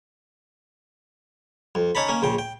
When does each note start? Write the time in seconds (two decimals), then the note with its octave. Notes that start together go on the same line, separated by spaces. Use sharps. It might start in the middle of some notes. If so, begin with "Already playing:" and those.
1.75 F2
1.95 C#4 D#4 C#5 A5 B5
2.08 A#3 C#4
2.22 A#1 C#3 G5
2.39 G5